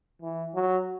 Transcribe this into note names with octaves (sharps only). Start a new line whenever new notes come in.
E3
F#3